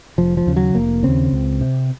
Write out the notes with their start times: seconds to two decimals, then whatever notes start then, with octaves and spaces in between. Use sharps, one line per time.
0.18 F1 F3
0.37 F3
0.47 D#2 C#3
0.56 F#3
0.75 F1 A#3
1.03 D#2 C#3 C4
1.33 C#2
1.61 C3